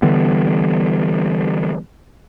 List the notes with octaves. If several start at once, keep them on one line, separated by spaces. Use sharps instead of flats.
D3 E3 G3 B3